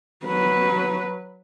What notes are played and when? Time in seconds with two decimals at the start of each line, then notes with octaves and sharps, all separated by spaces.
0.24 F#3 B4